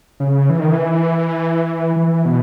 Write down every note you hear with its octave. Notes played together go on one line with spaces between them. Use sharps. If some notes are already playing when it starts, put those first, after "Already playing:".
C#3
E3
D#3
E3
E3
B2